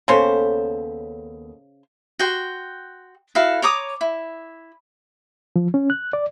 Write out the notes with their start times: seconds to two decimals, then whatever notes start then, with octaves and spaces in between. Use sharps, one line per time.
0.08 D#2 C#3 B3 C#4 A4 C5
2.19 F#4 G5 C6
3.35 E4 F#4 A4 F5
3.62 C#5 A#5 D6 D#6
4.01 E4
5.56 F3
5.74 C#4
5.90 F#6
6.13 D5